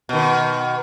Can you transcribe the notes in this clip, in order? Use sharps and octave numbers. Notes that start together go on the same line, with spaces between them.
B2 D#3